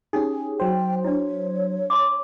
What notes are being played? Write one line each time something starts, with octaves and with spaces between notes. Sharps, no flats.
C#4 D#4 G4 G#4
F#3 C5 G5
D4 E4 C#5
A5 C6 D6